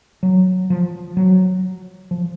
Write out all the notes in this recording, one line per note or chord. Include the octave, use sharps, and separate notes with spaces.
F#3
F3
F#3
F3